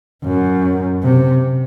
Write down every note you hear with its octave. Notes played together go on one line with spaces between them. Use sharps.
F#2
C3